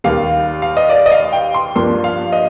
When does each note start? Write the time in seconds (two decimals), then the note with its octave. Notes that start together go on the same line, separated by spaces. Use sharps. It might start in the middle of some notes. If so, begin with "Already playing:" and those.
0.04 D#2 D#3 G3 A#3 F5
0.62 F5
0.77 D#5
0.90 D5
1.06 D#5
1.12 F5
1.33 G5
1.54 C6
1.75 G2 F3 A#3 D4 C6
2.04 F5
2.32 D#5